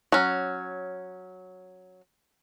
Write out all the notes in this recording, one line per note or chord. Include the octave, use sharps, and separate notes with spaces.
F#3 C#4